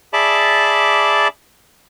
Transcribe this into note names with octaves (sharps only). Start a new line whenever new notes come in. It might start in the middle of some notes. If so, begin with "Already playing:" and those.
G#4 D5 E5 A5 B5 D6